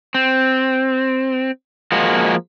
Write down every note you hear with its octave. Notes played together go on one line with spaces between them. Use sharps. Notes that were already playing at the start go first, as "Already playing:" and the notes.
C4
F3 G#3 A#3 F#4